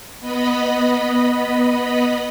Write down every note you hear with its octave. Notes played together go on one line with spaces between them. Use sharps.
B3 D#5 B5